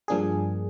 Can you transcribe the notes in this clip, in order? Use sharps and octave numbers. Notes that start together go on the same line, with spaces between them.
G2 F3 A#3 D4 G#4